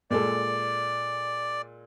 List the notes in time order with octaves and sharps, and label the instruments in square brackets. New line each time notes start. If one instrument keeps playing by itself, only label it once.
[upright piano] A#2 G#3 A4 [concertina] D5